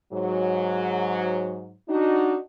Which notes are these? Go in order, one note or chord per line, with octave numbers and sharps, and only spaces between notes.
G#2 F#3
D4 D#4 F#4